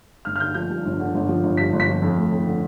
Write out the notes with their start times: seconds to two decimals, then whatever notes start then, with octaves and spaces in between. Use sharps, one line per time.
0.25 G1 F6
0.36 F6
0.40 D3 G6
0.54 F3 G6
0.70 G2
0.85 G1
1.00 D3
1.14 G1
1.29 F3
1.43 G1
1.57 G2 B6
1.73 G1
1.80 B6
1.88 F3
2.02 F2
2.17 A3
2.32 F2
2.47 D3